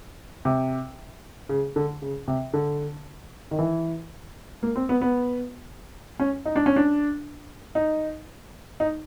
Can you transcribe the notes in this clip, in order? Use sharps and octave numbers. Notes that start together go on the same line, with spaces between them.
C3
C#3
D3
C#3
C3
D3
D#3
E3
A#3
C4
B3
B3
C#4
D#4
D4
C#4
D4
D#4
D#4